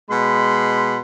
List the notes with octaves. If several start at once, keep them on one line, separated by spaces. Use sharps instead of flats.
B2 G#3 B5 C6